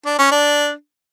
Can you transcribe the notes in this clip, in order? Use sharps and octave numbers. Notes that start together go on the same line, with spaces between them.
D4
C#4
D4